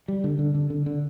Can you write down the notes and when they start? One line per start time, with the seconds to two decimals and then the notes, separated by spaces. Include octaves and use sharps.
0.08 G3
0.24 D3
0.39 D3
0.55 D3
0.70 D3
0.86 D3